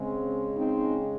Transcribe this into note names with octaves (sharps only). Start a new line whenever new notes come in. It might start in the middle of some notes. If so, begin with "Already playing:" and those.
Already playing: C#3 G#3 C4
C4 D#4